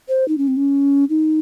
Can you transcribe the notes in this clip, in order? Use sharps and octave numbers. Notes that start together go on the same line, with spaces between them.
C5
D#4
C#4
C4
C#4
D#4